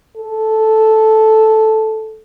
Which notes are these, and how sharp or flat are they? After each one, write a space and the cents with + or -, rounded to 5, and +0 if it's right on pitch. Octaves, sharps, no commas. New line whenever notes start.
A4 -5